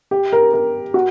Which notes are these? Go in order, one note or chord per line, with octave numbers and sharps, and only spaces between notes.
G4
A#4
A#4
F#4